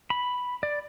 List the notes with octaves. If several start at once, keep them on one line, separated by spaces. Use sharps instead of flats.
B5
D5